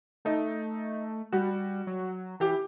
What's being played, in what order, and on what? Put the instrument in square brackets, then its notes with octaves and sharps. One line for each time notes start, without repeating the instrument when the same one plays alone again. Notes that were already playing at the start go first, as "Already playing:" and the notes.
[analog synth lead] A3 [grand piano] D#4
[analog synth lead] G3 [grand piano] F#4
[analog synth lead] F#3
[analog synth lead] E3 [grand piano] G4